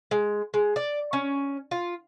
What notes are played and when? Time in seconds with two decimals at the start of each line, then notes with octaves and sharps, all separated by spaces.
0.11 G#3
0.54 G#3
0.76 D5
1.13 C#4
1.71 F4